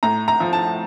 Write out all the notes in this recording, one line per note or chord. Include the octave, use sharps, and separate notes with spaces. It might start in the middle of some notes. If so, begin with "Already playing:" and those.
A2 A#5
A#5
F3
A5